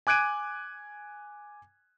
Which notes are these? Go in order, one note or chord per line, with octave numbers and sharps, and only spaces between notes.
G#5 D6 F#6 G#6 D7 D#7